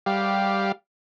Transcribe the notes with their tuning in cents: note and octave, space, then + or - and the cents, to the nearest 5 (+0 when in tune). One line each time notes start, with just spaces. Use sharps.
G3 +0 G4 -5 F5 +0